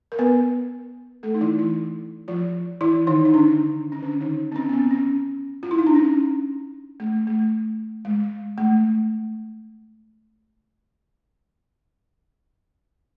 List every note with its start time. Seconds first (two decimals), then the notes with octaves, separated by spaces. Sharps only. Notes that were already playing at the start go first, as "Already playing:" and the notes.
0.12 A#4
0.19 B3 B4
1.23 A3 A4
1.34 D#4
1.41 E3 E4
1.58 E3 E4
2.28 F3 F4
2.81 E3 E4
3.07 D#3 D#4
3.25 D#4
3.34 D3 D4
3.92 C#4
4.03 D3 D4
4.21 D#3 D#4
4.52 C4
4.56 C#4
4.69 B3
4.73 C4
4.91 C#4
5.63 F4
5.71 E4
5.78 D#4
5.87 D4
5.95 C#4
7.00 A3
7.27 A3
8.05 G#3
8.58 A3